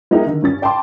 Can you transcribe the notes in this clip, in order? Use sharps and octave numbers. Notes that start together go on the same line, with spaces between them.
G#3 B3 D#4 E4 G4 A#4
D3 D#3
G2 C#4 A6
D5 G5 A5 B5 C6 D6